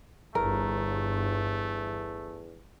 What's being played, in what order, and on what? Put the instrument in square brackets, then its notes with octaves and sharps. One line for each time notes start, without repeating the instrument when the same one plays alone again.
[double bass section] G1 [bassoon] E2 [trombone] A3 [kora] A#4